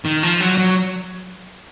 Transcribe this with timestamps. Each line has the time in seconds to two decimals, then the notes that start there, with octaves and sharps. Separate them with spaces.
0.05 D#3
0.23 F3
0.41 F#3
0.58 F#3